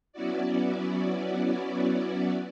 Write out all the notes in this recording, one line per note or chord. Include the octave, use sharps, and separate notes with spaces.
F#3 B3 C#4 E4 F#4 D5